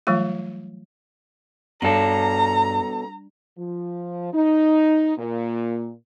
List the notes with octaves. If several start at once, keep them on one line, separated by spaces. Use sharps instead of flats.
E3 F#3 G3 A3 F4
G2 B2 A4 A#5
F3
D#4
A#2